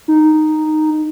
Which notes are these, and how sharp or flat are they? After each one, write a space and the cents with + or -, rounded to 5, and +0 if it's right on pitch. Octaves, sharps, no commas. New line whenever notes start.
D#4 -5